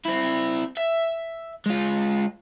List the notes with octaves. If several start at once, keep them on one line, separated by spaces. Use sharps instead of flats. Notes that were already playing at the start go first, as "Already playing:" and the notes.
C4 E4
E5
G#3 F4